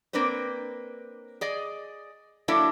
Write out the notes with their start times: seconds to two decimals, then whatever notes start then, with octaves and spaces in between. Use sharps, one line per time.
0.13 A#3 C4 D4 B4 C5
1.41 G#4 D5 D#5
2.48 F#3 A#3 D4 E4 A4 E5